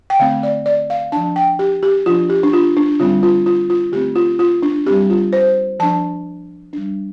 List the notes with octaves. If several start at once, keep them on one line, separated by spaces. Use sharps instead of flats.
G5
D3 A3 C4 F5
D5
D5
F5
F3 D4 A5
G5
G4
G4
F3 D4 F4
G4
D4
F4
D4
D3 G3 C4 F4
F4
F4
F4
D3 A3 C4 G4
F4
F4
D4
G3 C4 G4
F4
C5
F3 D4 A5
G3 D4